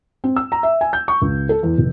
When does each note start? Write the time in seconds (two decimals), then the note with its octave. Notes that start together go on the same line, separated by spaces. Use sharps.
0.24 C4
0.36 E6
0.52 A#5
0.63 E5
0.81 G#5
0.93 G6
1.08 C#6
1.22 C#2
1.49 A4
1.63 E2
1.78 F1